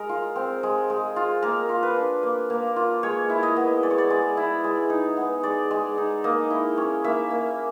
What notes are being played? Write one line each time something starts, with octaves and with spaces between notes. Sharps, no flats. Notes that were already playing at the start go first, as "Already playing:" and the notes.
Already playing: G#3 A#4
F4
C4
G#3
G#3
F4
A#3 A#4
F4
B4
D4
A#3
A#3
F4
G#3 C#5
E4
D#5
B3
G#3 D5
C#5
D5
G#3
E4
G#3
D#4
B3
G#3 D5
G#3
D#4
A#3 D#5
E4
C#4
A#3 E5
A#3